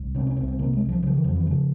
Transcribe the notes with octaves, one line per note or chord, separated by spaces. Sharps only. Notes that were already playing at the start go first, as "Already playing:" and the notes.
Already playing: C2
C3 C#4
C#4
C2 C4
C4
C3 A#3
G#3
C2
F3
C#3 F3
E3
F2 F3
E3
C#3 F3